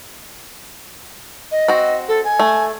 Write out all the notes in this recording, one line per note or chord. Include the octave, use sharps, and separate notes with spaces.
D#5
C4 F#4
A4
G#5
A3